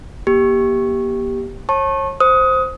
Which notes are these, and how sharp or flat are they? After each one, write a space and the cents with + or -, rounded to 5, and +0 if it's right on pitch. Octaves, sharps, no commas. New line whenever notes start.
A#3 +40 G4 +0
C#5 -35 A5 +0 C#6 -30
C5 +0 D#6 +20